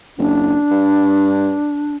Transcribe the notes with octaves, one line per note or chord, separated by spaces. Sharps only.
F#1 D4
G2